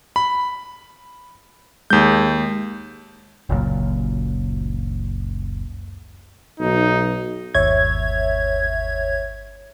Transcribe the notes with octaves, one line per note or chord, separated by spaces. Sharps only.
B5
D#2 G#3 G6
F#1 C#2 F#2 A#2
B1 D#4
G1 D#2 C#5 E5 G#6